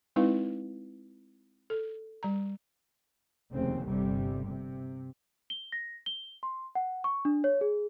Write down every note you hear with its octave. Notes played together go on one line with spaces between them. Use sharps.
G#3 C4 D#4 E4 B4 F5
A4
G3 A#5
F1 D#2 C#3 C4
G1 C3 G3
C3
G7
A#6
G7
C6
F#5
C#6
D4
C#5
G#4